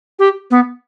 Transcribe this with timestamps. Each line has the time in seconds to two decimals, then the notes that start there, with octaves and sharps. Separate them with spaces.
0.19 G4
0.51 B3